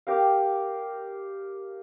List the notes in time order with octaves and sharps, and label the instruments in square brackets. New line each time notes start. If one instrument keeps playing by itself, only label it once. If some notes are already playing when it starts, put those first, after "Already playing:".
[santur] G4 A#4 F5